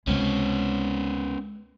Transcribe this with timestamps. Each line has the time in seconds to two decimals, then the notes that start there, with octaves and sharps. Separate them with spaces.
0.07 C#2 C3 G#3 B3 C#4